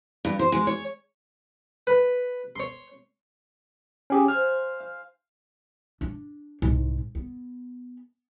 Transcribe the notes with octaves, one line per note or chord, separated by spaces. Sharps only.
G2
C5
G#3
C#5
B4
C#5 C6
C#4 G4 G#4
C5 F5 G#5 F6
F5
D4
C2 G#2
B3